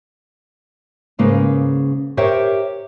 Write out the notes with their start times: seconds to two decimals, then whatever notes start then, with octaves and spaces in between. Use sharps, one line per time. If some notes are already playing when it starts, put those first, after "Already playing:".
1.19 G#2 C#3 A#3 B4
2.17 G4 A#4 C5 C#5 E5 G5